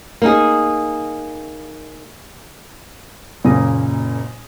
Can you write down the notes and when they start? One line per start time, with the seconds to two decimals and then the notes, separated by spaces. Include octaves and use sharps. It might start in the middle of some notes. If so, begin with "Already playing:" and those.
0.22 A#3 D#4 G#4
3.44 F#1 A#2 C#3 A#3 D#6 A#6